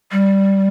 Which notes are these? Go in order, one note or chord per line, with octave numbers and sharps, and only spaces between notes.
G3